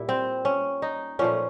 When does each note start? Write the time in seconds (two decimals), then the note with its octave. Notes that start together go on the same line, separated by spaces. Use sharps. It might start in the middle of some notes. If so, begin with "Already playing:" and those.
Already playing: A#2 G3 E4
0.09 C4
0.45 C#4
0.82 D#4
1.19 A#2 F3 A3 C#4